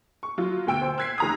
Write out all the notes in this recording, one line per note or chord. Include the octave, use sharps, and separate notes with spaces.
C#6
F#3 F4
D2 B2 G5 E6 D7
C5
E6 F#6 G#6 B6 C7
F1 A#5 D#6